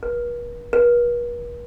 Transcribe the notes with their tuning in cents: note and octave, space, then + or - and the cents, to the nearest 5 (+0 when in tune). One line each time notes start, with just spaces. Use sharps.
B4 -45
B4 -45